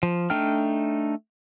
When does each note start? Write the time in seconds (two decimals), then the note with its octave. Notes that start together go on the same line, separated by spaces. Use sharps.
0.03 F3
0.30 A3 D4 D#4 G5 F6